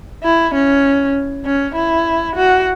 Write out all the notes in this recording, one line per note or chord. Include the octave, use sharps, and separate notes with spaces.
E4
C#4
C#4
E4
F#4